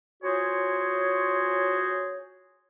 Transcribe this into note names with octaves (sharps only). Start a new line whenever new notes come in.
C#4 F4 F#4 G#4 C5 C#5